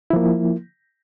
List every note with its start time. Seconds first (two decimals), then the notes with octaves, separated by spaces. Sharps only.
0.10 E4
0.13 F3
0.16 A#3